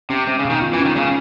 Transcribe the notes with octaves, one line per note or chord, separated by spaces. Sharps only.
C3 C#4
C3 G#3
C#3
B2
D#3
F4
E3
C#4
D#3
C#3 G#3